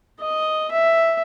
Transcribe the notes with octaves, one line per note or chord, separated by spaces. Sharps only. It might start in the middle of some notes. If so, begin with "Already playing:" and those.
D#5
E5